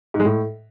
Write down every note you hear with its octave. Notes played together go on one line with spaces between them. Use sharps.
G#2
G#3
A2